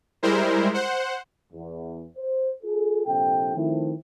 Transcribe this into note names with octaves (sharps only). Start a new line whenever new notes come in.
G3 G#3 E4 A#4 C5
C5 F#5
E2
C5
F4 G#4 A4
A#1 C3 A4 G5
D#3 F3 A3 C4 E4